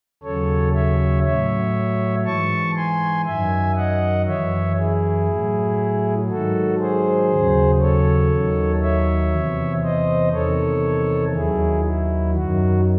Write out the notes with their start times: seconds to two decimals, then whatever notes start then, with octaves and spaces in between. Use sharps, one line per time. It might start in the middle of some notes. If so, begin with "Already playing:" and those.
0.23 D#2 C#3 F#3 A4 C#5
0.74 C#5 E5
1.24 A2 F#3 C#5 E5
2.25 G#2 E3 A5 C#6
2.76 G#5 C6
3.26 F#2 D#3 F#3 E5 G#5
3.77 D#5 F#5
4.27 F#2 E3 C#5 E5
4.78 E4 G#4
5.28 A2 F#3
6.29 G#2 D#3 F#3 F#4 A4
6.80 G#4 C5
7.31 D#2 C#3 F#3
7.81 A4 C#5
8.31 D#2 D#3 F#3
8.82 C#5 E5
9.33 E2 C3 E3
9.83 C5 D#5
10.33 E2 C3 D#3 A4 C#5
11.34 D#2 D#3 F#3 E4 G#4
11.85 E4
12.35 F#2 D#3 F#3 F#4